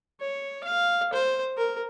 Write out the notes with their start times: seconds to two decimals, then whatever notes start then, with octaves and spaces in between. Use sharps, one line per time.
0.21 C#5
0.64 F5
1.13 C5
1.57 A#4